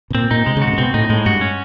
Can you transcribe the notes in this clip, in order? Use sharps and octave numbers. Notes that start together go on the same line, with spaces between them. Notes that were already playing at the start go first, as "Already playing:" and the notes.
B2
A#2 C4
A#2 D#4
C3 G#3
C#3
F#4
C3
A#2
B2 C4
A2 D#4
A2 G#3
G2 F#4
C#4